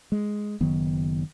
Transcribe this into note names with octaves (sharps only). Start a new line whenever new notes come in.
G#3
F#1 D#3 F#3 B3